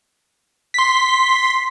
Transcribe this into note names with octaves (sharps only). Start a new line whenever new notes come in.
C6 B6